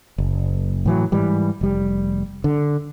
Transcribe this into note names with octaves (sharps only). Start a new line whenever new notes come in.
F#1
A2 E3 F#3
G#2 E3 G3
F1 G3
D3